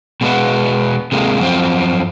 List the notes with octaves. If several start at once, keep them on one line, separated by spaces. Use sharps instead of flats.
B2 G#3 A#3 B3
C3 G#3 A#3
F#2 F3 C4